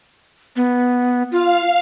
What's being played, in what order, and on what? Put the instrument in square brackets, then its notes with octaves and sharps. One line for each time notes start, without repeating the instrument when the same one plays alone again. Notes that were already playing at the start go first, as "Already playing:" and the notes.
[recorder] B3
[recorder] F4 [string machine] F5